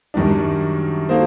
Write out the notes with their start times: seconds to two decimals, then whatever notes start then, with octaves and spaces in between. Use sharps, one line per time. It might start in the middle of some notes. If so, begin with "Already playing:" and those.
0.14 F#2 D#3 G3 D4
1.09 F#3 A#3 D#4 A4 C5